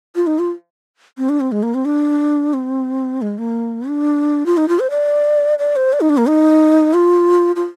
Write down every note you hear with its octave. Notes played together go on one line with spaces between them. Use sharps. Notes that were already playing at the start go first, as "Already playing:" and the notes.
F4
D#4
F4
C4
D4
C4
G#3
A#3
C4
D4
C4
G#3
A#3
D4
F4
D#4
F4
C5
D5
D5
C5
D5
D#4
D4
A#3
D#4
F4
F4